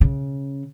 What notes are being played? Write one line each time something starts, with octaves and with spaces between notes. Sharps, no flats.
C#3